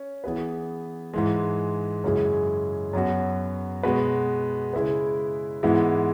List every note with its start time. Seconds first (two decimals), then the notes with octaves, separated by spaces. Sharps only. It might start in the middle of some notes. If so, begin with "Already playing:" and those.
Already playing: C#4
0.24 E3 B3 G#4 B4
1.14 G#2 E3 G#3
2.04 F#2 C#3 G#3 E4 G#4
2.93 F#2 F#3 B3 F#4
3.83 B2 G#3 B3 F#4 B4
4.73 C#3 G#3 E4 G#4 B4
5.63 G#2 E3 G#3 B3 E4